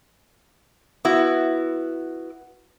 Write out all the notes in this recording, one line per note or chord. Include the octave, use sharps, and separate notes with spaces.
B3 E4 F#4